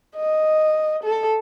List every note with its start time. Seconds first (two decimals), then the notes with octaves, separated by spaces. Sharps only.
0.17 D#5
1.04 A4